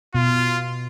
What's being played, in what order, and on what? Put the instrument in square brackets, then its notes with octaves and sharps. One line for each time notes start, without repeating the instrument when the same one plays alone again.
[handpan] B2 [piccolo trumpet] F4